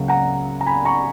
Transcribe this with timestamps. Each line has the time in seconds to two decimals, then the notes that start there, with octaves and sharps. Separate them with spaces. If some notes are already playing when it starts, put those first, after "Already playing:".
Already playing: C#2 C#3 F#3 A#3
0.08 F#5 A#5
0.61 A#5
0.66 G#5 B5
0.85 A#5 C#6